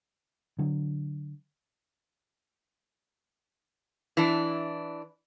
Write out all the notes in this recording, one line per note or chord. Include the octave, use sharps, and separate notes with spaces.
D3 F#3
E3 D4